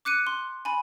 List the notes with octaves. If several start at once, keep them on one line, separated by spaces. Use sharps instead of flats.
D6 F#6 C#7 D#7
C6
G#5 B5